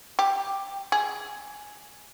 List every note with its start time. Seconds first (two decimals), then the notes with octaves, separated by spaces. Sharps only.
0.19 G4
0.92 G#4